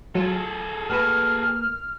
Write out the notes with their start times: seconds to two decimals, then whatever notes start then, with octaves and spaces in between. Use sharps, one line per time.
0.15 F#3 F4 G#4 A4
0.89 A#3 F#4 B4 F6